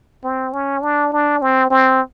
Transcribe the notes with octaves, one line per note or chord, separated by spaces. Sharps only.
C4
C#4
D4
D4
C4
C4